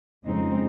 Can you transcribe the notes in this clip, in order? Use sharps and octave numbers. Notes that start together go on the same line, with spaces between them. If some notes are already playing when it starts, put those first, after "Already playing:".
F2 C#3 G#3 C4 D#4